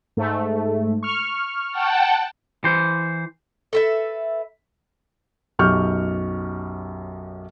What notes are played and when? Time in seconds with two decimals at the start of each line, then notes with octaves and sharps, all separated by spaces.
0.17 G#2 A3
1.03 C#6 F6
1.72 F#5 G5 A5
2.64 E3 C5
3.73 A4 B4 E5
5.59 B1 F#2 G4 C#6 F6 G6